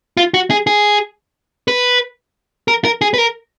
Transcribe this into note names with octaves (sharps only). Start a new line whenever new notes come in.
F4
F#4
G#4
G#4
B4
A#4
A#4
G#4
B4
A#4